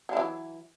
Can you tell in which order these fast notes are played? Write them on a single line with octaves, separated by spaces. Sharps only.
F#3 E4 E3